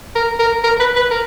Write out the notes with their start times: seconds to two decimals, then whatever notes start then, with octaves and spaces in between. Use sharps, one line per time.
0.15 A#4
0.39 A#4
0.64 A#4
0.80 B4
0.95 B4
1.11 A#4